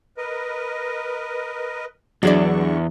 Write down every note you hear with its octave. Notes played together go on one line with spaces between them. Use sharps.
A#4 B4 D#5
E2 G2 D3 F#3 D4 G#4 D5 C#6